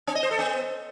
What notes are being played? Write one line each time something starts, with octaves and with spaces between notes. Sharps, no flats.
C4
D#5
C5
A4
B3